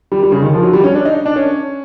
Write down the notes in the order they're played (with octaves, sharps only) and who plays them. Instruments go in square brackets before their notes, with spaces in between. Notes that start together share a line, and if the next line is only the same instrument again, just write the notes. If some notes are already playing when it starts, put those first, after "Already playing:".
[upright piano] G3
G3
C#3
D#3
F3
F#3
G3
C#4
D4
D#4
D4
C#4